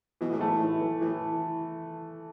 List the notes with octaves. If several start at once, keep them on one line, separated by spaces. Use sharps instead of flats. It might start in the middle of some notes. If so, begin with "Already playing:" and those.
B2 E3
A2
G#2 A3
A2
E3
E3
A2 E3